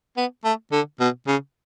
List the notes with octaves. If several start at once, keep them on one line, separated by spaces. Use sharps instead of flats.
B3
A3
D3
B2
C#3